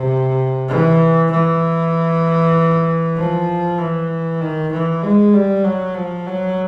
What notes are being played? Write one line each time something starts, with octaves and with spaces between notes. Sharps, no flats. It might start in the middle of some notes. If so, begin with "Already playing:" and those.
Already playing: C3
E3
E3
F3
E3
D#3
E3
G#3
G3
F#3
F3
F#3